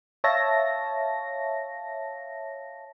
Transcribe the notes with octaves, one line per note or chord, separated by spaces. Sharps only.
C#5 E5 F5 A5 A#6